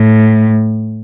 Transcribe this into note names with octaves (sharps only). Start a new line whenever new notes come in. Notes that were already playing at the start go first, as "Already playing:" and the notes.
Already playing: A2